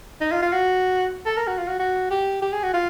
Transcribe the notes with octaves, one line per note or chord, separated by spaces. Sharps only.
D#4
F4
F4
F#4
A4
A#4
F#4
F4
F#4
F#4
G4
G4
G#4
F#4
F4